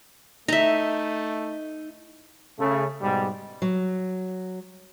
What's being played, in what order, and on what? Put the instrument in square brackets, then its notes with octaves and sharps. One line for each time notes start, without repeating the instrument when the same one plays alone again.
[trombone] A3 [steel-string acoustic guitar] D#4 [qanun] E5 A#5
[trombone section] C#3 A3
G#2 B2 G3
[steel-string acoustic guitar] F#3